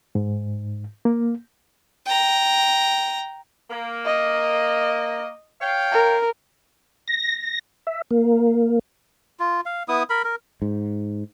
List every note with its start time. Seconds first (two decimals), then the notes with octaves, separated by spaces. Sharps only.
0.15 G#2
1.05 A#3
2.07 G5 A#5
3.70 A#3
4.06 D#5
5.60 C#5 F5 G5
5.92 A#4
7.08 A#6
7.87 E5
8.11 A#3
9.40 F4
9.66 F5
9.88 B3 E4 D#6
10.10 A#4 B5
10.24 A#4
10.62 G#2